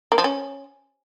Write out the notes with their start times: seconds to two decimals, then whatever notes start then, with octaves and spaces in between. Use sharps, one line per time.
0.12 A#3
0.18 F3
0.24 C#4